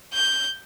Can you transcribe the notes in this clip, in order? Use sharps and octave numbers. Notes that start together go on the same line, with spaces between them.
G6